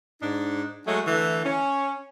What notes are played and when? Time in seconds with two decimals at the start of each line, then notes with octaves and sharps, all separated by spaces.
0.22 G#2 D4 D#4
0.86 F#3 G#3 A3
1.06 D3 E3 A3
1.45 C#4